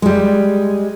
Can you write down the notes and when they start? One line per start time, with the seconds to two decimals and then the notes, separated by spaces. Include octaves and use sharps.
0.02 G3 G#3